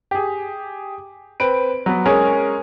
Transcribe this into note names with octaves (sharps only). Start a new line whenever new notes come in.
G4 G#4
C4 B4 D7
F#3 B3
G#3 C#4 G#4 A#4 C#5